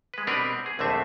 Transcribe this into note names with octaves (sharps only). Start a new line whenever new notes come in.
G#3 B4
B2 G3 C4 D4 A#4 B4
G#4
A#1 D#2 D3 A3 C4 E5